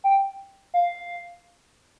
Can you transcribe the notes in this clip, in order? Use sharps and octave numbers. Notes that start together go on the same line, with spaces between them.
G5
F5